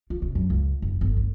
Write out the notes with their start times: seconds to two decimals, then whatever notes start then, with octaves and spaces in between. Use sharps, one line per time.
0.10 F4
0.22 C3
0.35 F#2
0.50 C#2
0.82 F#1
1.01 G1
1.17 D2